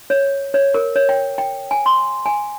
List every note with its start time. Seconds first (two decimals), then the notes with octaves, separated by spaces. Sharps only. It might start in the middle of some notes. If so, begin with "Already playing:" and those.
0.10 C#5
0.54 C#5
0.74 A#4
0.96 C#5
1.09 G5
1.38 G5
1.71 G#5
1.86 C6
2.26 G#5